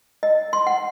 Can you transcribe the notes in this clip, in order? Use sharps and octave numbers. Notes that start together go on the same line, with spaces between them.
D#5
C6
F#5